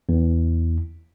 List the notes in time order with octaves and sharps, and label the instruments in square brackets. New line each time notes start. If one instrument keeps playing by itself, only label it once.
[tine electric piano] E2